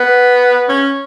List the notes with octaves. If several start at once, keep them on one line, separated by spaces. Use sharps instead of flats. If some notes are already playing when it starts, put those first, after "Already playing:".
Already playing: B3
C#4